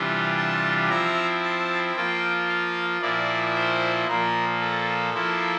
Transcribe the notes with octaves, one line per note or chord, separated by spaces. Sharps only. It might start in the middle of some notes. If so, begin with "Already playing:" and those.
Already playing: C3 E3 G3 D4 F4
A5
F3 C4 E4 A#5
A5
F3 A#3 F4 G5
F5
A#2 F3 A#3 E4 D5
C5
A#2 F3 A#3 A#4
A4
F3 A#3 E4